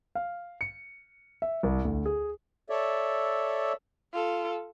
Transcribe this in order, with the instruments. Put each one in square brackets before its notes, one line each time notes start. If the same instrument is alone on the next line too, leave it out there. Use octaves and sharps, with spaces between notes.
[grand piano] F5
C#7
E5
C2
D2
G#4
[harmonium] A4 C#5 D5 E5
[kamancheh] F4 A4